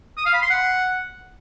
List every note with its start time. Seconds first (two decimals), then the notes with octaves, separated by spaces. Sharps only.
0.17 D#6
0.25 F5
0.34 B5
0.42 C6
0.50 F#5